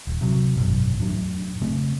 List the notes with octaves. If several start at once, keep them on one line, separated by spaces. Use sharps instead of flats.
D#1
C3 F#3
G#1 F#2 B2
F2 A2 F#3 D4
C#3 A3 C4